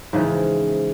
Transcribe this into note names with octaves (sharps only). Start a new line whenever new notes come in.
G#2 C#3 E3 F3